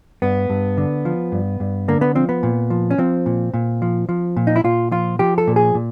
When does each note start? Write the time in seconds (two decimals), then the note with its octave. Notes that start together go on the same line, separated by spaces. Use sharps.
0.22 G2 B3
0.50 G2
0.77 D3
1.05 F3
1.32 G2
1.60 G2
1.88 D3 A#3
2.01 B3
2.15 F3 C4
2.29 B3
2.43 A#2
2.70 F3
2.91 C#4
2.98 F3 C4
3.26 A#2
3.54 A#2
3.82 F3
4.09 F3
4.37 A#2
4.47 D#4
4.56 E4
4.64 A#2 F4
4.91 F3 F4
5.19 F3 G4
5.38 A4
5.47 A#2
5.56 G#4
5.75 A#2